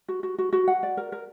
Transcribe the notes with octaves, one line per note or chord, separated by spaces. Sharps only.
F#4
F#4
F#4
F#4
F#5
D5
A#4
A#4